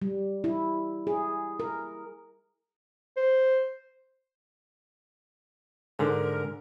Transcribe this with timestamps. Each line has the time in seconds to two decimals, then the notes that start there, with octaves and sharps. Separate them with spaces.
0.02 G3
0.44 E4
1.07 G#4
1.60 A#4
3.17 C5
5.99 G#2 D3 A#4